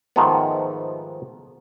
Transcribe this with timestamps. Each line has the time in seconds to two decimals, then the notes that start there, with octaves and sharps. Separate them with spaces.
0.16 G#2 D#3 F3 A3 B3